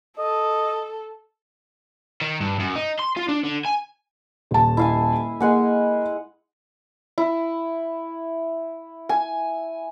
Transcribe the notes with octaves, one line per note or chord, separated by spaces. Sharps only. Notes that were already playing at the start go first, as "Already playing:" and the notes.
A4 D#5
D#3
G2
F#2
D#4
C6
F4
D4
D3
G#5
D#1 A5
E4 F5 G#5
G#3 A#3 F#5 G#5
E4
G#5